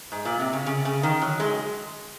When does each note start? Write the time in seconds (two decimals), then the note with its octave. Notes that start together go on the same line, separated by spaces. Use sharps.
0.12 G#2
0.25 A#2
0.40 C3
0.53 C#3
0.66 C#3
0.85 C#3
1.03 D#3
1.21 F#3
1.40 G#3